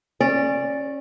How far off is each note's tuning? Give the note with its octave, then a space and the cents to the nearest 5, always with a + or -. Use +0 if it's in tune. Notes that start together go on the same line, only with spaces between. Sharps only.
C#4 -20 D5 +0